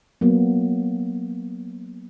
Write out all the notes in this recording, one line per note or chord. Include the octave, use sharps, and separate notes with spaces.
F#3 A#3 B3